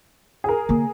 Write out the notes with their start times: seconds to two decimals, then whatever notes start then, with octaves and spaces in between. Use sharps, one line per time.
0.44 G#4 A#4
0.69 D3 A#3